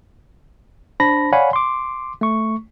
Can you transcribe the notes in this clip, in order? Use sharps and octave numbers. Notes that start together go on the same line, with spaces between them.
D4 C5 A5 B5 A#6
C#5 D5 F5 F#5 G#5 B5
C6 D6
A3 C#6